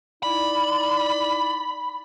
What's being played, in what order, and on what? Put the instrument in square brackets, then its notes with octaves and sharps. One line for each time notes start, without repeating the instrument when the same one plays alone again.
[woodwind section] D#4 E4 D5 [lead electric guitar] B5